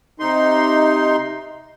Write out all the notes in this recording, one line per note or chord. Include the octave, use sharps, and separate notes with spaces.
C3 D#4 C6